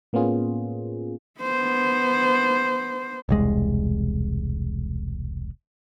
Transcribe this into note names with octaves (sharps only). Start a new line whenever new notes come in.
A2 A#3 B3 C#4 F4 G#4
B3 C5
E1 C2 G#3